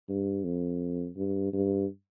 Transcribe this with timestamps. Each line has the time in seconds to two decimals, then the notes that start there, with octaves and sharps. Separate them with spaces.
0.09 G2
0.44 F2
1.17 G2
1.53 G2